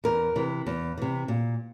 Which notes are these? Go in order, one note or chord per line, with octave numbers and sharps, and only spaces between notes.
E2 A#4
C3 E3
E2
C3 E3
A#2